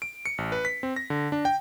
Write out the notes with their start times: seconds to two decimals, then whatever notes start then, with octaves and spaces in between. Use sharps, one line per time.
0.02 D7
0.26 C#7
0.38 A1
0.52 B4
0.65 B6
0.83 C4
0.96 A#6
1.10 D3
1.32 D4
1.45 G5